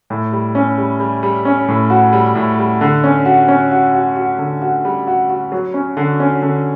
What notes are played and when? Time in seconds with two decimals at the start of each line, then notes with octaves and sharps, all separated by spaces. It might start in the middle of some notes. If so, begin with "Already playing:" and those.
0.10 A2
0.32 G3
0.55 C#4
0.78 G3
1.00 G3
1.23 G3
1.45 C#4
1.68 A2
1.90 F#4
2.13 G3
2.35 A2
2.59 G3
2.81 D3
3.04 C#4
3.25 F#4
3.48 C#4
3.72 F#4
3.94 F#4
4.16 F#4
4.38 D3
4.62 F#4
4.85 G3
5.07 F#4
5.29 F#4
5.52 F#3
5.74 C#4
5.97 D3
6.20 C#4
6.42 D3